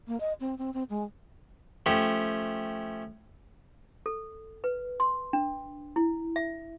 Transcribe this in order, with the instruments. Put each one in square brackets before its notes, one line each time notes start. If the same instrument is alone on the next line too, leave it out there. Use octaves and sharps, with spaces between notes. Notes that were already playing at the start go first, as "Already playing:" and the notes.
[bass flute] A#3
D#5
C4
C4
C4
G#3
[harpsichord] F3 A3 C#4 G4
[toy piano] A4
B4
C6
D4
E4
E5